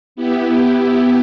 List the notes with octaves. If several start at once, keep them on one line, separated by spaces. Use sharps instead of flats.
B3 E4 G4